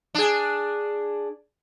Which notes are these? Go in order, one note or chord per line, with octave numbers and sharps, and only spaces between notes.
D4 G#4